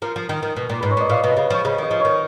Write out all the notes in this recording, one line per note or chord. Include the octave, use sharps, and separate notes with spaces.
F3 A#4
F3
D#3
D#3
B2
A#2
G#2 B4
C#5
A#2 D#5
A#2 F5
B2
D#5
C#3 F5
F3 C#5
C#3 D#5
D#3 D#5
F3
D#3 C#5